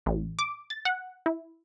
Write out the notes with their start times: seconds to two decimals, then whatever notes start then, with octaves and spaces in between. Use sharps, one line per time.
0.06 A1
0.39 D6
0.70 A6
0.85 F#5
1.26 E4